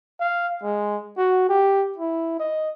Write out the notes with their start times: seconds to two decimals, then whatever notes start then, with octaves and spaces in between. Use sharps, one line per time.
0.20 F5
0.63 G#3
1.18 F#4
1.49 G4
1.98 E4
2.40 D#5